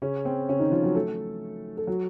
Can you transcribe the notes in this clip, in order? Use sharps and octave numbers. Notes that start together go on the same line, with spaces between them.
C#3 C#4
C4
C#3 C#4
D#3 D#4
F3 F4
F#3 F#4
A3 A4
A4
F#3 F#4